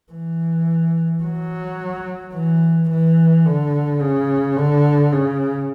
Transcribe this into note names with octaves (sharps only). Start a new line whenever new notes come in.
E3
F#3
E3
E3
D3
C#3
D3
C#3